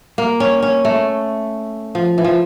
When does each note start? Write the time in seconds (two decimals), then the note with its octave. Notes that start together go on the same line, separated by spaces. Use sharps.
0.18 A#3
0.40 C#4
0.62 C#4
0.85 A3
1.95 F3
2.18 E3
2.24 F3